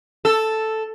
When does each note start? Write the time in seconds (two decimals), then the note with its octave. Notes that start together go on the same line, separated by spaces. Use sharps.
0.25 A4